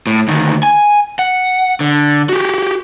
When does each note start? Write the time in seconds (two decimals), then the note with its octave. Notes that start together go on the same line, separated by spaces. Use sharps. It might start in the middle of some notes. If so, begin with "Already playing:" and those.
0.07 A2
0.28 D2 D#3
0.63 G#5
1.19 F#5
1.81 D3
2.29 F#4 G4